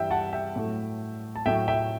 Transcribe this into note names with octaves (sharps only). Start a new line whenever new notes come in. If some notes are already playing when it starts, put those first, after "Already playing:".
Already playing: G2 E3 G3 E5 G5
F#5 A5
E5 G5
A2 F#3 A3
A5
A2 F#3 A3 E5 G5
E5 G5